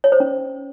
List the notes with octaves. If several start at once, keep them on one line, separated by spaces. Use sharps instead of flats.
C#5
C5
C#4